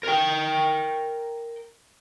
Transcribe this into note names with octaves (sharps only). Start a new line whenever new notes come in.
A#4 G5